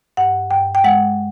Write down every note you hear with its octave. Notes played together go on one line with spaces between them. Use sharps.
G2 F#5
G2 G5
G5
G#3 F#5